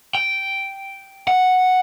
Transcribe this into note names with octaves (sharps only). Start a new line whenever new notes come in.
G5
F#5